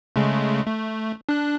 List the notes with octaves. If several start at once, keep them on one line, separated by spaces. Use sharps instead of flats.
C#3 G#3 A3
A3
D4 F#6